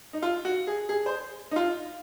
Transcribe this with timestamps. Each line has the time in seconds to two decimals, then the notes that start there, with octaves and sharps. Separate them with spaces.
0.13 D#4
0.22 F4
0.45 F#4
0.67 G#4
0.89 G#4
1.06 C5
1.51 D#4
1.56 F4